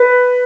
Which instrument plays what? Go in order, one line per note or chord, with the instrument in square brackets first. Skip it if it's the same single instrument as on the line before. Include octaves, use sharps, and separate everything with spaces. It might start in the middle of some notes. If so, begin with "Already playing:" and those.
Already playing: [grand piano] B4